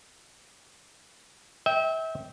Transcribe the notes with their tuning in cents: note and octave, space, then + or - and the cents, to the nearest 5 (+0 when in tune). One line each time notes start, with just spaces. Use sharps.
E5 -30 G5 +0